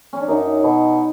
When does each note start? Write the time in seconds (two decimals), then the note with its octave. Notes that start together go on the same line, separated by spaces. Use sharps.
0.13 C#4
0.20 D4
0.28 F#2 D#4
0.64 B2